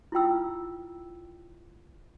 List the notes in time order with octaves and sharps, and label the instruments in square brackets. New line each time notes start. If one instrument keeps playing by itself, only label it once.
[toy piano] E4 F4 G5 E6